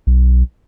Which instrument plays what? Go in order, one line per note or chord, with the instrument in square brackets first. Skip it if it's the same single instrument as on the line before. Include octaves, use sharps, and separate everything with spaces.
[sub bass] B1